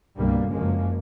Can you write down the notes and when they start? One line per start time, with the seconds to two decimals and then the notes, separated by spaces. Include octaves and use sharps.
0.16 C2 G2 B2 D3 G3 A#3
0.48 F#1 C#3 F3 G#3 A#3